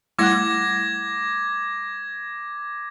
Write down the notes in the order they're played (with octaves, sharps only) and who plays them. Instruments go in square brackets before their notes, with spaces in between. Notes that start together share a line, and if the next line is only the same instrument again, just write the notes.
[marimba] G3 F#5 F#6 [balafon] A3 E4 [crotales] D6 G#6 A#6